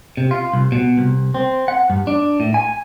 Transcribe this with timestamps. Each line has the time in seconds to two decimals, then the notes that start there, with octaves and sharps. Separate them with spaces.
0.17 C3
0.31 F4
0.53 C2
0.72 B2
0.98 C2
1.34 C4
1.68 F#5
1.90 G2
2.07 D4
2.40 A2
2.54 G#5